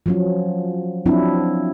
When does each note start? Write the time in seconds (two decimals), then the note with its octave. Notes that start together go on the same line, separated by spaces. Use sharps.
0.06 F3 F#3 C#4
1.06 F3 F#3 C4 D4 E4